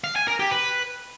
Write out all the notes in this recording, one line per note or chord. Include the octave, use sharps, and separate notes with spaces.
F5
G#5
A#4
G4
B4